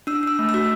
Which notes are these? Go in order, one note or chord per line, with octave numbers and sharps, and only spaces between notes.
D4 E6
D4 E6
A3
E6
F#4